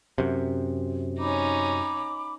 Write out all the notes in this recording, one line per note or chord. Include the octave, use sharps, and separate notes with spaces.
F#2 C3
C#4 D#4 B5 D6